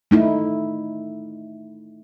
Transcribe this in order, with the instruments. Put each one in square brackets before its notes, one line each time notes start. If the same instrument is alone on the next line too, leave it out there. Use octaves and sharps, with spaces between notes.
[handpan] A3 D#4 E4